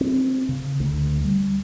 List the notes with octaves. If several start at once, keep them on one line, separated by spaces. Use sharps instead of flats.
C4
C#3
D2
G3